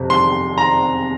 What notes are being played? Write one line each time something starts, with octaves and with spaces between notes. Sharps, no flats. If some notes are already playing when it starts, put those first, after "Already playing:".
Already playing: F2 C3
C6
A#5